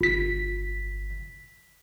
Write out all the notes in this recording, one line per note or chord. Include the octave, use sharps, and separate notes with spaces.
G1 B6